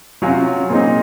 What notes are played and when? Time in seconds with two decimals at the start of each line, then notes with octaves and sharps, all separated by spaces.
0.22 C3 F#3 C#4 F4
0.70 A#2 G#3 C4 D#4